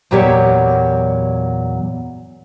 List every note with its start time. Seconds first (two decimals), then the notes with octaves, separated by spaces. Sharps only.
0.11 E2 A#2 F#3 G4 C#5 D5